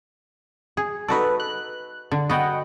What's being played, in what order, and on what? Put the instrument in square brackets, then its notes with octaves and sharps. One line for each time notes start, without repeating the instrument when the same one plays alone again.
[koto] G#4
[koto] D#4 F#4 D5 [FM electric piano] A4 B4
[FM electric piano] F#6
[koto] D3
[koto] B3 F#4 [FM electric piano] D#5 F#5 G5